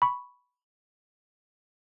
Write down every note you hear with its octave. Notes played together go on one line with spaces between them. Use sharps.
B5 C#6